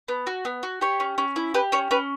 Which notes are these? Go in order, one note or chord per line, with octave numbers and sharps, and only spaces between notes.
B3
F#4
B3
F#4
G4 C#5
C#4
C#4
E4
G4 B4
C#4 C#5
C#4 B4